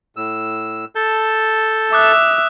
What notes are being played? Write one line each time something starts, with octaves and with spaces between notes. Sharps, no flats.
A2 E6
A4 A5 G6
E5 D6 D#6 F#6